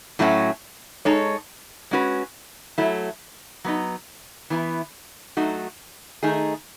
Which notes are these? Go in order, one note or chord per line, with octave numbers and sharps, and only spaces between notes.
A2 F#3 A3 C#4 F#4
G#3 D#4 A4 C#5
G#3 C#4 F#4 B4
F#3 A3 E4
F#3 B3 D#4
E3 B3 E4
F#3 A3 D#4 F#4
D#3 A3 D#4 G#4